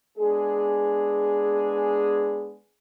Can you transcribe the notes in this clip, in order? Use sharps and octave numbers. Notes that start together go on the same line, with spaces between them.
G#3 B3 D4 G#4